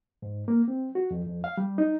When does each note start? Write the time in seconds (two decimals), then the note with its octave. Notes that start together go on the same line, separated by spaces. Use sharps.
0.22 G#2
0.48 A#3
0.68 C4
0.95 F#4
1.11 F2
1.26 F2
1.44 F5
1.57 G3
1.78 D#4